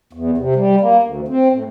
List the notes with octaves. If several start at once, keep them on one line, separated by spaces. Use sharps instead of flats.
E2
C3
G3
A#3
D2
C4
A2